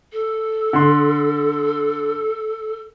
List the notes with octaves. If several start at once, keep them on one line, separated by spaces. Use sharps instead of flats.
A4
D3 C6